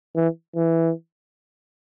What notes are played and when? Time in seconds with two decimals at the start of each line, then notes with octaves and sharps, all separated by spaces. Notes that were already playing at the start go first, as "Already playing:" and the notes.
0.15 E3
0.55 E3